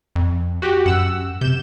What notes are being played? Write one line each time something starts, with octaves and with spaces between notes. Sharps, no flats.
F2
F#4 G4
F#2 F#5 E6
C3 G6 E7